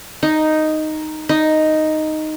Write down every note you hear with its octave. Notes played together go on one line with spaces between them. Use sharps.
D#4
D#4